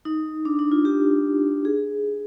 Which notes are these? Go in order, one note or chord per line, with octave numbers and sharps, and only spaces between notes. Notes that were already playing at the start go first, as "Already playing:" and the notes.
D#4
D4
D#4
F4
G4
G#4